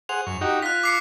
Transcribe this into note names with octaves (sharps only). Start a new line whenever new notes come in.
G#4 C5 F#5 F7
F#2 C#6
D#4 F#4 G4
F4 F#6 B6
D6 C7 C#7